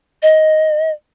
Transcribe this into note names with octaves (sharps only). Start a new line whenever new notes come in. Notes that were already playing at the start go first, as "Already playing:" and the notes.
D#5